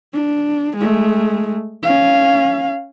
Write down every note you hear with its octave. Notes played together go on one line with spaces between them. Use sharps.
D4
G#3 A3
C#4 F5